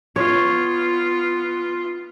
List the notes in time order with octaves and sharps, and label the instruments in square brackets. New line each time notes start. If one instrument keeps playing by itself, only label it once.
[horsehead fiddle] B3 F4 [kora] C#5